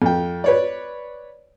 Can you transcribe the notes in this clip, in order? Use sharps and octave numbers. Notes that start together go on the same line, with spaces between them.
F2 G5
B4 C#5 D5